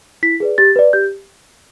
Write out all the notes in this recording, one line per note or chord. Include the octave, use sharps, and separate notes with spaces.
E4 B6
G#4 B4 D5
G4 A6
B4 D5
G4 G6